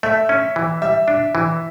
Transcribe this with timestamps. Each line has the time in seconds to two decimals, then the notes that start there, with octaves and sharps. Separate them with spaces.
0.03 A3 E5
0.29 C#4
0.56 E3
0.82 G3 E5
1.08 D4
1.35 E3